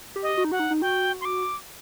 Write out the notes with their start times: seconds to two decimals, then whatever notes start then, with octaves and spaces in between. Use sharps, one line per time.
0.16 G4
0.23 D#5
0.37 F#4
0.45 D#4
0.52 F#4 F#5
0.59 D#4
0.71 D#4
0.81 F#4 G5
1.21 C6
1.25 D6